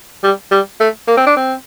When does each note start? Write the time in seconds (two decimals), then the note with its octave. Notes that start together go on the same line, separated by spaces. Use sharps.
0.23 G3
0.51 G3
0.80 A3
1.08 A#3
1.17 C4
1.27 D4
1.36 C4